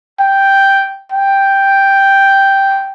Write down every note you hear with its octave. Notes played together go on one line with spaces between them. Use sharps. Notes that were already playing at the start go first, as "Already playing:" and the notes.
G5
G5